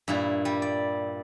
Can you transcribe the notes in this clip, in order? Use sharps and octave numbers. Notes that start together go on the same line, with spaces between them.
G2 A#2 E4
G3
D5